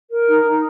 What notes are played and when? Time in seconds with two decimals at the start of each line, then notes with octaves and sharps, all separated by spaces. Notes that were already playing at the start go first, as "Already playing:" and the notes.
0.11 A#4
0.28 D#4
0.46 D#4